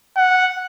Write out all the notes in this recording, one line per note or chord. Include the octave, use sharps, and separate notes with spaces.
F#5